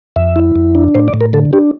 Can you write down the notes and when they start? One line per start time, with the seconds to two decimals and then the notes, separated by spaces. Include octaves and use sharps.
0.16 F2 E5
0.36 E4
0.56 F2
0.75 D4
0.95 A2 C5
1.08 D5
1.14 A2
1.21 A#4
1.33 D3 A4
1.53 D4 G4